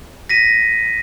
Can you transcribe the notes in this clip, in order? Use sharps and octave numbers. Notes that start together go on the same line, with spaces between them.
A#6 B6 D#7